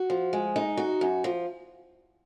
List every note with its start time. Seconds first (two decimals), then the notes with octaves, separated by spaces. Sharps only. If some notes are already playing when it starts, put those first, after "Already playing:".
Already playing: F#4
0.10 F3
0.33 G#3
0.56 D#4
0.77 F#4
1.01 F#2
1.24 F3